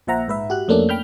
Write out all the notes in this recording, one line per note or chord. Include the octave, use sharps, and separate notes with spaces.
A#1 A#2 C5 E5 F#5 A#5
G#2 B4 E5
F#4 G4 F#6
F2 A3 A#3 C#4 D4
G5 B5 F6 G6